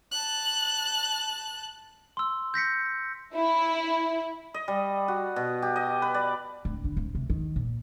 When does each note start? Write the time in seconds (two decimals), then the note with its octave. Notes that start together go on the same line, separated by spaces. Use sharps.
0.12 A5 F#6
2.17 C6 E6
2.54 G6 A#6 B6 C#7
3.35 E4
4.54 D#5
4.68 G3
5.08 F#4
5.36 B2
5.62 G4
5.76 D#5
6.02 B4
6.14 D5
6.65 D1
6.84 D3
6.97 D1
7.15 C3
7.30 D#3
7.56 A#2